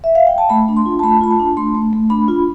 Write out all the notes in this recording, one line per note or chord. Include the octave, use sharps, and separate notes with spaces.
E5
F5
G5
A5
A3 B5
D4
C6
F4
A5
A3 B5
F4 B5
A5
D4
A3 C6
A3
A3
D4 B5
F4